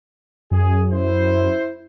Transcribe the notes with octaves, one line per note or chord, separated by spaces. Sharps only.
F#2 G#4
E4 C5